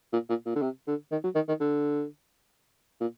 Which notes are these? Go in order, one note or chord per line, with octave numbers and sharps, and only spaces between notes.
A#2
A#2
A#2
D3
C3
D3
D#3
F#3
D#3
D#3
D3
A#2